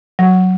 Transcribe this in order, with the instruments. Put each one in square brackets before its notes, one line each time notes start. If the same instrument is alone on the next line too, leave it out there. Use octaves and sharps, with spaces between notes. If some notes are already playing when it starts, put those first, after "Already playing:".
[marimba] F#3